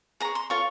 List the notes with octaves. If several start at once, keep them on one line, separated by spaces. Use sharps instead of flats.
G#4 C#5 A#5
C6
F4 A4 C#5 C#6